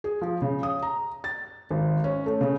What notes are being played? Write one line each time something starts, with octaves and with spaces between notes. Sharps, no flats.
G#4
F3
C#3
D#6
A#5
A6
G#1
C#4
A3
C#3